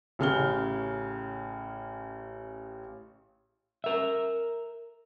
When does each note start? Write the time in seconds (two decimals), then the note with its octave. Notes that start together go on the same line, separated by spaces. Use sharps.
0.19 A1 C#3 F6 G7
3.84 A#4 E5